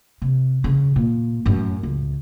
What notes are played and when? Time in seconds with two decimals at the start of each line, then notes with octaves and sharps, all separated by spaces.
0.22 C3
0.64 C#3
0.96 A#2
1.46 F#2 A2
1.83 C#2